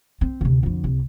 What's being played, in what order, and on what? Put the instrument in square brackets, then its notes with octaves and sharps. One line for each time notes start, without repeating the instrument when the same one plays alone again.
[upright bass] C4
D2 C3
F2 D3
C2